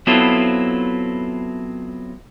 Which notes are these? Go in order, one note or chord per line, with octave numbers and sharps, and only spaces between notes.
F#3 B3 C4 E4 F4 A4